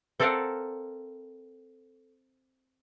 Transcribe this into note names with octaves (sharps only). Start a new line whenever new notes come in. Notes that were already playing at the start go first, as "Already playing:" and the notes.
C4 A4 A#4 D5 F5 F#5